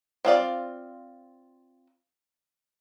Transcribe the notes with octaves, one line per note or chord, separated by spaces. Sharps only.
C4 F4 D5 F5